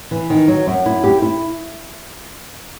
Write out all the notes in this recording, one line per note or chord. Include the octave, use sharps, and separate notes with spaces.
E3
D#3
F#3
F#2
E4
G4
E4